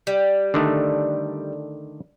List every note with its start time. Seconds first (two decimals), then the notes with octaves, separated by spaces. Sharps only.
0.07 G3
0.54 D3 D#3 A3